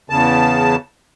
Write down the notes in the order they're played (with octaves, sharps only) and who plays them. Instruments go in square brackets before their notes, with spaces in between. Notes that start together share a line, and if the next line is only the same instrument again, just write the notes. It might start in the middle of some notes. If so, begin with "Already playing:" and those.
[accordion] E2 C#3 A5